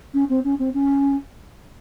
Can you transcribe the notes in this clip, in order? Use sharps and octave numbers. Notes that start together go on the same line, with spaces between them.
C#4
C4
C#4
C4
C#4